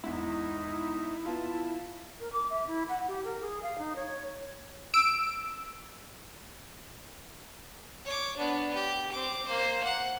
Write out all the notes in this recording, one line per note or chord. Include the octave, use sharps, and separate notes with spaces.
E2 G#2 D#4 E4
B3 F4 A5
A#4
D6
E5
E4
F#5
G4
A#4
G#4
F5
D#4
C#5
E6 D7
C#5 D6
B3 D4
G4
C4 D6
A#3 C5
F#5